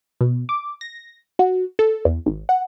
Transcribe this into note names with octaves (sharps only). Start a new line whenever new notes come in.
B2
D6
A#6
F#4
A4
E2
G#1
F#5